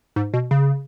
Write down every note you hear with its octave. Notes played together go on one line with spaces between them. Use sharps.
G#2
B2
C#3